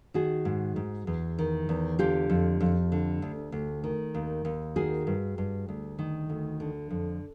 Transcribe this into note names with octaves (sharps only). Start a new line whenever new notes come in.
D#3 F#4 G#4
G#2
G#2
E2
D#3
E2
D3 F4 G4
F2
F2
D3
D2
D2
D#3
D#2
D#2
D#3 F#4 G#4
G2
G2
D2
D#3
D2
D3
F2